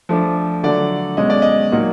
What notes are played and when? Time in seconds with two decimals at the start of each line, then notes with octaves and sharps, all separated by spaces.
0.09 F3 A3 D4
0.64 D3 F#3 A3 D5
1.17 B2 G#3 C#4 D#5
1.30 D5
1.42 D#5
1.72 A#2 F#3 A#3 D#4